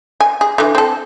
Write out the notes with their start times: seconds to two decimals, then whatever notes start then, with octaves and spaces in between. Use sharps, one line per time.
0.20 G#5
0.41 G#4
0.58 D3 E3
0.75 C4 A4